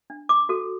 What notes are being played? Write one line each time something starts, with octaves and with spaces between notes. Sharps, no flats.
D4
D6
F#4 A4